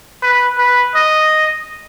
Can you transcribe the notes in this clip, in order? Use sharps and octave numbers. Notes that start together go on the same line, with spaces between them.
B4
B4
D#5